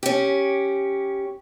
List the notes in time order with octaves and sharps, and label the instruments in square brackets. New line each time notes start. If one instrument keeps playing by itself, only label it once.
[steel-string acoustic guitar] C#4 G4